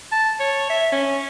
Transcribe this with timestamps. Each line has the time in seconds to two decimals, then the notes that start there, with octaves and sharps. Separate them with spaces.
0.12 A5
0.40 C#5
0.69 E5
0.92 C#4